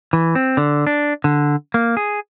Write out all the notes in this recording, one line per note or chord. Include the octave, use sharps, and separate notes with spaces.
E3
C4
D3
D4
D3
A#3
G#4